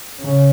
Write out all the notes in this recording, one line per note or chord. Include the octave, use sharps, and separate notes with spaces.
C#3